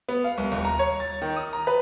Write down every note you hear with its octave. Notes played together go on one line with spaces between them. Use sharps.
B3
F5
C2
D#1
A#5
C#5
A6
D#3
D#6
A#5
B4